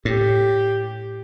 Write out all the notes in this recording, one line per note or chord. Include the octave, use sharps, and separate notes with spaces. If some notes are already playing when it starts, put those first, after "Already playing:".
A2 G4